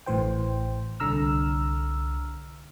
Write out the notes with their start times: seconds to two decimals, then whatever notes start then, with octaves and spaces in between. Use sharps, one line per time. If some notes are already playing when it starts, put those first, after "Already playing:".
0.06 A1 A2 E3 C5 G5
1.00 C2 D3 A#5 E6 F6